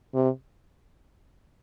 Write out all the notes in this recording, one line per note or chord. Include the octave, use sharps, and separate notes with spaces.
C3